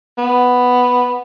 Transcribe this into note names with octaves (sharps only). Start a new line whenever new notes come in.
B3